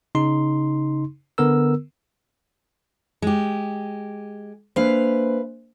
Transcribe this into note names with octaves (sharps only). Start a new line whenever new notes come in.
C#3 D#4 C6
D3 B3 A#4 E6
G#3 G4
A#3 D4 B4 C5 F5